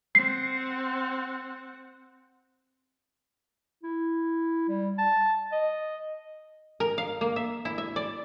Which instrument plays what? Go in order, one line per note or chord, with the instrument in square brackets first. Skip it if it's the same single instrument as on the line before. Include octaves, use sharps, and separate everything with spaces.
[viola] C4 F#5 [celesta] C7
[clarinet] E4
G3
A5
D#5
[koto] A#4
F5
A#3
E5
E4
E5
D5